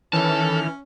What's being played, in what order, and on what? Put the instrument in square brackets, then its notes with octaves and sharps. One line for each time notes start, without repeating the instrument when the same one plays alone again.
[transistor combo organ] D#3 F6 [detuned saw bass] E3 [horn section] C#4 [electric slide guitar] A4 A5